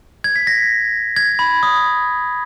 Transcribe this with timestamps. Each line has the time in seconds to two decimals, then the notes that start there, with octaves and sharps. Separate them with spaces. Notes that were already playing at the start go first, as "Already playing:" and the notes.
0.24 G#6
0.36 B6
0.47 A#6
1.16 G#6
1.39 B5
1.63 D#6